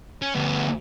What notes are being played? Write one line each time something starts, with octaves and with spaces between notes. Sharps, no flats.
C#4
D2 B3